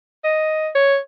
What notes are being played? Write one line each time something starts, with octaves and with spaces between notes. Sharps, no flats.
D#5
C#5